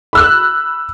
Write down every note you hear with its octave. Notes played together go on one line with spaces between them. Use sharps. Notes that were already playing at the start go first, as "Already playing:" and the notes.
B5 E6 F#6